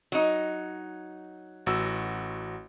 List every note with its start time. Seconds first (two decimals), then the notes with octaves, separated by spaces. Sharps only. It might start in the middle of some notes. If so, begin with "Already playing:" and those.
0.12 F#3 D#4
1.66 A1 F#4 E6